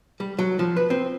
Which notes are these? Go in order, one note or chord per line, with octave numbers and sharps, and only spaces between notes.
G3
F#3
F3
B4
C4